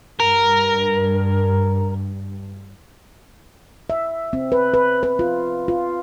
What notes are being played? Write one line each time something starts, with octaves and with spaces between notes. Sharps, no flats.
G2 A#4
E5
C4
B4
B4
B4
F4
F4